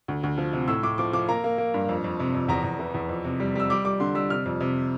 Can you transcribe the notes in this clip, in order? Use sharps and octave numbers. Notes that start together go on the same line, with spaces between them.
D2
D2
F3
C3
A2 E6
A2 D6
F3 D6
F3 D6
A#3 A#5
A#3
A#3
G2
F2
F2
C3
F2
E2 A#5
E2
E3
E2
F2
C3
G3
G3 E6
G3 D6
G3 D6
D3 C6
G3 E6
C3 F6
F2
C3